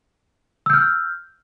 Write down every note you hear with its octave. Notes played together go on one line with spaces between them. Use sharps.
E6 F6 G6